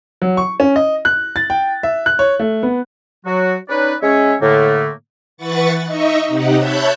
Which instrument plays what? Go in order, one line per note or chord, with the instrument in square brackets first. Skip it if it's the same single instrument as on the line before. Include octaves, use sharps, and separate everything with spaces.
[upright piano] F#3
C#6
C#4
D#5
F#6
A6
G5
E5
F#6
C#5
A3
B3
[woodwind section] F#3 F#4
C#4 D#4 B4 D5
G#3 C#4 C#5 E5
A2 D3 A3 A#3
[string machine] E3 B4 F#5 C#6 A6
D#4 D#5 E5 C#6
C3 D#4 G4 F#5
C#5 E5 A5 B5 F#6 G6